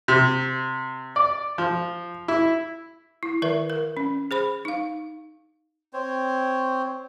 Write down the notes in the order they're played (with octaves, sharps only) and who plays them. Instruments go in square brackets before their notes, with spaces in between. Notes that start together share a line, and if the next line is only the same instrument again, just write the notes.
[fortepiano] C3
D5
F3
E4
[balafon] E4
D#3 A#4 B4 E5
A#4
C#4
G#4 C5 B5
D#4 F5
[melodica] C4 C5 C#5